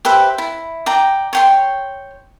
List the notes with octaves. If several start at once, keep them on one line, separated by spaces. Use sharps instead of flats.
G4 B4 C5 E5
E4
D5 G5 A#5
C#5 G5 C6